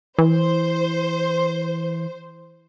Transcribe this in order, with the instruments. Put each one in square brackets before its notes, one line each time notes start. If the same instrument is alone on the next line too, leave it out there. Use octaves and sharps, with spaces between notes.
[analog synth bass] E3 [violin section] C5